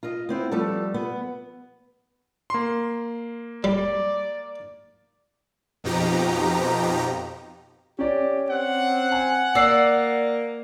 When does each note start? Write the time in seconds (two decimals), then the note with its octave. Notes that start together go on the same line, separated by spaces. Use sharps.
0.03 F4 D#5
0.29 B3 C4 E4
0.51 F3 G3 A3 A4
0.94 B3
2.50 A#3 C6
3.64 G3 D5
5.84 F2 B2 F3 D#4 G4 A#5
7.99 C#4 G4 D5
8.50 C4 F#5
9.12 G#5
9.55 A#3 D5 E6 C7